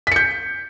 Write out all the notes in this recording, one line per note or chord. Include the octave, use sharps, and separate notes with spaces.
G6 B6 C#7